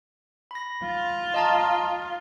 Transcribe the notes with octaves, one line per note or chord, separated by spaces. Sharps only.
B5 A#6
F4
D#5 A5 A#5